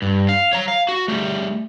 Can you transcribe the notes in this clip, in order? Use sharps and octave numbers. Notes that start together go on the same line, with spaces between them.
G2
F5
C#5 A#5
F5
F#4
G3 A3